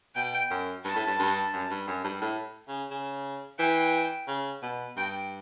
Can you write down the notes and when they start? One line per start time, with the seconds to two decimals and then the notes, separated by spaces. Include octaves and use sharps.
0.15 B2 G5
0.51 F#2
0.85 G2 A5
0.96 A2
1.07 G2
1.19 G2
1.53 F#2
1.71 G2
1.88 F#2
2.05 G2
2.22 A2
2.68 C#3
2.91 C#3
3.59 E3 G5
4.28 C#3
4.63 B2
4.96 G2 G5